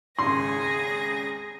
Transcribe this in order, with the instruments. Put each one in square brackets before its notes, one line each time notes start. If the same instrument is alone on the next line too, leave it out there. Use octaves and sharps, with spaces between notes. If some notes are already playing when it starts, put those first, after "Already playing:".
[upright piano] G#1 D#2 C#3 [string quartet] G#4 A#6 [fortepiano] C6